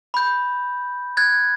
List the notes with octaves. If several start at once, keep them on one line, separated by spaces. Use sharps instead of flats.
B5 G6
F#6 G#6 A6